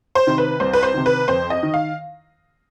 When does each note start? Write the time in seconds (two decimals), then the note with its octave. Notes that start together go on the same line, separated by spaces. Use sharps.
0.15 C5
0.27 C3 D#3
0.38 B4
0.60 C2 C5
0.73 B4
0.83 C5
0.94 C3 D#3
1.06 B4
1.28 F2 C5
1.50 D#5
1.63 D#3
1.74 F5